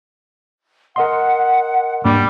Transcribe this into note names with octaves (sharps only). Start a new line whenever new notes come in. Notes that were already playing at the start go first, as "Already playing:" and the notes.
A#4 D#5 F#5 C6
G#2 G3 A#3 D4